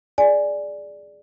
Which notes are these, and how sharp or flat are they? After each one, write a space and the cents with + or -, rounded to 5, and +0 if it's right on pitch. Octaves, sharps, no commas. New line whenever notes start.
G#4 +0 D5 +0 G#5 +0